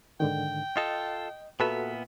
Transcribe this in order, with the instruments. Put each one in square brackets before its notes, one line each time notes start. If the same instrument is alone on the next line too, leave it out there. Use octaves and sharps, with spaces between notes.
[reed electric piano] G#2 D3 D#3 [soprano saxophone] G5
[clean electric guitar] F4 A4 [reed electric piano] D#5
[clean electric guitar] A#2 B3 E5 [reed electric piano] F#4 A4 B4